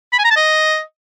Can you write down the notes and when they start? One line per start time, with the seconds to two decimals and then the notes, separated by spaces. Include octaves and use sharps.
0.13 B5
0.19 G#5
0.24 A#5
0.30 A5
0.36 D#5